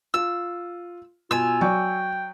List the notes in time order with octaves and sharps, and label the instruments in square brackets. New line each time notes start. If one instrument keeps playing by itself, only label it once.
[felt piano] F4 [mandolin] E6
[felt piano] B2 [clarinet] F4 [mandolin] G#5 E6
[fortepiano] F#3 D5 [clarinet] G5 [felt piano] C#6